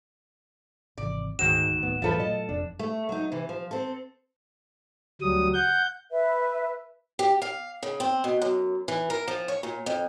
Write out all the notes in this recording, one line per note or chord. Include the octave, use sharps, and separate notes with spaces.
G#1 C3 E3 D5
D#1 D2 G#2 D#3 F#4 E7
D1 A2 B3
E2 A2 E3 F3 G3 F4 A4 B4
A#2 F#3 A3 D#5
F1 F2 D4
A3
F#3 D#4
C3 E3
F3
C4 A4
D2 F#3 G3 D#6
F#5 G6
B4 E5
G4
F5
C#3
C4
B2
F#2
E3
A#4
F3
C#5
A#2
F2